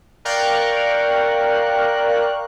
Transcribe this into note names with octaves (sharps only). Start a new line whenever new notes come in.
A#4 D5 F5 G5 C#6 F#6